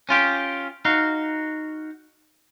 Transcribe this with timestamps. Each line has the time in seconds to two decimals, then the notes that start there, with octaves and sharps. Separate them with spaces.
0.09 C#4 F4 G4
0.85 D#4 F#4 F5